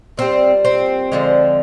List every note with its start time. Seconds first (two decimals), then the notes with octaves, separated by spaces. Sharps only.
0.17 A#2 G3 C4
0.65 C4
1.12 D3 F3 G#3